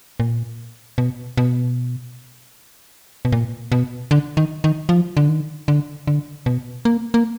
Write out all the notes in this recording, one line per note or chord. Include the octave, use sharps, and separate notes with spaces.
A#2
B2
B2
B2
A#2
B2
D3
D#3
D#3
F3
D3
D#3
D3
D3
B2
A#3
A#3